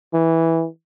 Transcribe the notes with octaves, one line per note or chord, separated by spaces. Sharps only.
E3